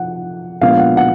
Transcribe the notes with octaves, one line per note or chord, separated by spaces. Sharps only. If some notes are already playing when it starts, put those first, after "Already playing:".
Already playing: F3 F#5
A#2 F3 G#3 B3 D4 F5
F#5
F#5